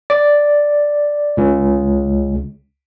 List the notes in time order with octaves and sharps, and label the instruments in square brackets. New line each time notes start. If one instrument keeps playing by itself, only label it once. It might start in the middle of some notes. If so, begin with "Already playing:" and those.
[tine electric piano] D5
C#2